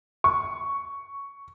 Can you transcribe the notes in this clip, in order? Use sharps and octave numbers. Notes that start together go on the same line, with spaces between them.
C#6